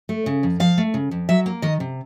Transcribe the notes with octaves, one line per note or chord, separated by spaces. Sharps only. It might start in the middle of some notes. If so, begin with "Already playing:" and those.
A3
C#3
F2
F3 F5
A3
C#3
F2
F#3 E5
A#3
D#3 D#5
C3